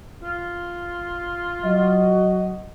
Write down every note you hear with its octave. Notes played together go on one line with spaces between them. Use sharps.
F4
F#3 F#4 D#5